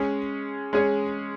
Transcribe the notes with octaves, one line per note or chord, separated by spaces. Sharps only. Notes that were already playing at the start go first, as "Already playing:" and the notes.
Already playing: G#3 C#4 G#4 C#5
G#3 C#4 G#4 C#5